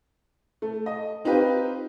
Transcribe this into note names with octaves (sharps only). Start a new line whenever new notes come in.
A3
D#5
C4 D#4 F4 G4 B4 C5